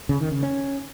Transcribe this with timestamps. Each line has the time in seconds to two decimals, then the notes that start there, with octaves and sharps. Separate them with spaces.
0.09 C#3
0.20 D#3
0.31 C#3
0.43 C#4